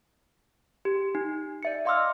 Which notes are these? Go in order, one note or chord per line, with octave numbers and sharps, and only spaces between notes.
G4
D#4
D5 E5 C#7
D#5 F5 C6 D6 E6 F6